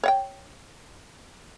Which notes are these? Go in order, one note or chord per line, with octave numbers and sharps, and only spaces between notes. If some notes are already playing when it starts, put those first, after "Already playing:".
C#5 F#5 G5